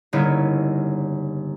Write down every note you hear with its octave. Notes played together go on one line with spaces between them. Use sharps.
G1 C#3 A#3 D#4 E4 C#5